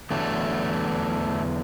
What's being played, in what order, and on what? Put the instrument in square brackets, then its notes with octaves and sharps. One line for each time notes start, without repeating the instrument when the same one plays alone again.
[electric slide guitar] E2 D3 F#3 A3